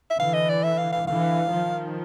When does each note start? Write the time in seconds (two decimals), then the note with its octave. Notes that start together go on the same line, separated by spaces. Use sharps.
0.10 E5
0.19 D3 E3 F5
0.34 D#5
0.49 D5
0.63 E5
0.78 F5
0.93 F5
1.07 D3 E3 F5
1.51 D#3 F3